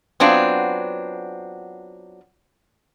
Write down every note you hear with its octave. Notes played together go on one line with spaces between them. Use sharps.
F#3 B3 C4 D4 F4